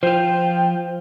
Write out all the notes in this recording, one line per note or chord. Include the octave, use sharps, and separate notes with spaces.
F3 F4 C5 G5